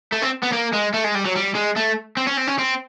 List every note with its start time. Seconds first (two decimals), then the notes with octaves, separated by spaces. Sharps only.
0.13 A3
0.22 C4
0.43 B3
0.53 A#3
0.73 G#3
0.94 A3
1.04 G#3
1.15 G3
1.25 F#3
1.36 G3
1.55 G#3
1.77 A3
2.17 C4
2.27 C#4
2.37 C4
2.47 C#4
2.58 C4